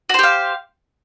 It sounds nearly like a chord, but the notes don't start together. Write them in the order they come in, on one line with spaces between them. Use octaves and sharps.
F#4 C5 G4 F5